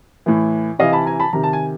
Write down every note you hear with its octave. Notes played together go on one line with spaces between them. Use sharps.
A2 E3
C3 E3 D#5 F5
A5 B5
G#5 A#5
A5 B5
C3 D#3 A#5
A5
G#5